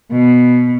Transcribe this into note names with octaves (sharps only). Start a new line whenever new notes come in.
B2